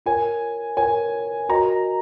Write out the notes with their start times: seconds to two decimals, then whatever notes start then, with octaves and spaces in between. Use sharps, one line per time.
0.06 F4 A#4 C#5 G#5
0.77 F4 A#4 C#5 G#5
1.49 F#4 A#4 D#5 A#5